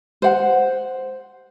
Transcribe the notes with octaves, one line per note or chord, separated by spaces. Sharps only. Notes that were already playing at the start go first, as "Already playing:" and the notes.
C5 F#5